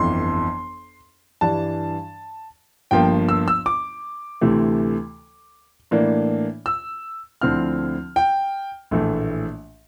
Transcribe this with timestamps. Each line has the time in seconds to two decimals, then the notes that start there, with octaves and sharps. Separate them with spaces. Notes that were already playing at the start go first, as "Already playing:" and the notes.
Already playing: G1 F2 E3 C6
1.41 G2 E3 G3 D4 A5
2.91 G1 G2 F3 A#3 G5
3.29 E6
3.48 E6
3.66 D6
4.41 D2 C3 E3 A3
5.91 A2 E3 A#3 D4
6.66 E6
7.41 D2 D3 F3 C4 E4 F6
8.16 G5
8.91 A#1 A2 E3 A3